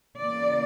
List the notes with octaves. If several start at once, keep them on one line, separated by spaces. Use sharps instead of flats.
C#3 E3 A#3 D5